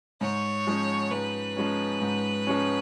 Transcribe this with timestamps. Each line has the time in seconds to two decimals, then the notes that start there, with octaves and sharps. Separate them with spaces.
0.21 G#2 C#5
0.67 F3 G#3 C#4
1.11 G#2 B4
1.57 F3 G#3 C#4
2.01 G#2
2.47 F3 G#3 C#4